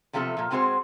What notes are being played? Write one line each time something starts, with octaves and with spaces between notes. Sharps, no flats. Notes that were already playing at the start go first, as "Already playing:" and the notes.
E2 C3 F3 A3 F4 A4
A#2 F3
G#2 G#3 C4 F#4 G#4 C5